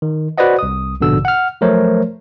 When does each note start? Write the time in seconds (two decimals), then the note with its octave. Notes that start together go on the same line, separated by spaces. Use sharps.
0.02 D#3
0.38 F#4 B4 C5 D5 D#5 F#5
0.59 C2 D#6
1.01 A#1 G#2 B2 D3 E6
1.25 F#5 F6
1.61 F3 F#3 A3 A#4 C5 C#5